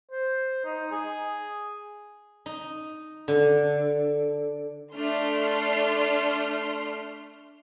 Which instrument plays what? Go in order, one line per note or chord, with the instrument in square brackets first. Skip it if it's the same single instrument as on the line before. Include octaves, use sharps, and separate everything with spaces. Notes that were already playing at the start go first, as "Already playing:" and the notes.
[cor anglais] C5
D#4
G#4
[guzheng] D#4
D3
[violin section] A3 D4 C6 F6